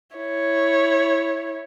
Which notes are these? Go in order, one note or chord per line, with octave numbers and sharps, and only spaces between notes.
E4 C#5